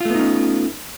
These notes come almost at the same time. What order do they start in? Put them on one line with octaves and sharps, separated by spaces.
F4 A3 B3 D#4 C#4